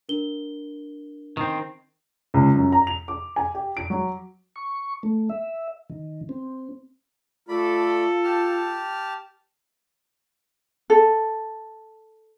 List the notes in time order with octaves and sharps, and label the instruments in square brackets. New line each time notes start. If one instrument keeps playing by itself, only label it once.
[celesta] D4 A#4 G7
[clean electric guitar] D#3 C4
[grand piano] C#2
F#2
A#5
F7
D6
G#5
G4
D7
F#3
[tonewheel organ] C#6
A3
E5
D#3
C4
[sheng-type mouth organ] A3 D5 B5 [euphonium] F4 [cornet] A4
[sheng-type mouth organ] G4 A5 F6
[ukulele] A4